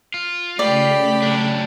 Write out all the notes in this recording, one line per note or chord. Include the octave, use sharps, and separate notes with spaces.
F4
C#3 A3 G4 D5 B5
F#3 D4